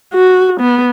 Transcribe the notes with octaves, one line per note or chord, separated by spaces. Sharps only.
F#4
B3